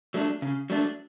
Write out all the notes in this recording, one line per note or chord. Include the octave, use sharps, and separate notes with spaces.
F#3 A3 D4
C#3
F#3 A3 D4